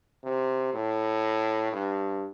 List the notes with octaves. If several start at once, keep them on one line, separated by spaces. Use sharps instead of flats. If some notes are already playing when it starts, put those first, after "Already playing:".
C3
A2
G2